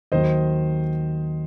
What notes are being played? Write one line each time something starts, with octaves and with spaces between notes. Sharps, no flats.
D#2 D#3 F#3 C5 D#5